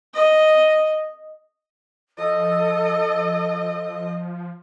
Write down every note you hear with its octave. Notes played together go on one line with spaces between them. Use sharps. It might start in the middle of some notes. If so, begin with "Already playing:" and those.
D#5
F3 A4 D#5